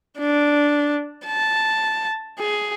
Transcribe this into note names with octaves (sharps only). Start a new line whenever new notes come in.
D4
A5
G#4